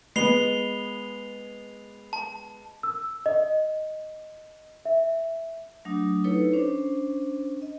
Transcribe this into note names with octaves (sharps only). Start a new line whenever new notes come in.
G#3 B3 C7 F7 G7
A5
E6
D#5
E5
F#3 A3 D4 D#6
D#4 E4 A4 B4 C#5
C#4 D4 C5
D#5